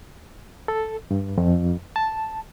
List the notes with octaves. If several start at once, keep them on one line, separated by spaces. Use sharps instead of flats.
A4
G2
F2
A5